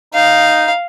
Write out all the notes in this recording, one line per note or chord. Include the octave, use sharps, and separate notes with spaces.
D#4 F5